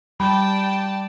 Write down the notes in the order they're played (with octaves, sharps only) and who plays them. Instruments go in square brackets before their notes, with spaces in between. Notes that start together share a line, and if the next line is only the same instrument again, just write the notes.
[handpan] G3 [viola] D5 A5 [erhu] G5 [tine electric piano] B5